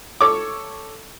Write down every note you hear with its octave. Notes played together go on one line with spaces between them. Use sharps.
A4 C#5 C#6 D6